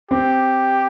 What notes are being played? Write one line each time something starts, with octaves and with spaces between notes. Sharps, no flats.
C4 G4